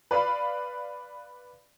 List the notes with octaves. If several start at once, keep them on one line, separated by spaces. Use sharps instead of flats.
B4 D5 F5 B5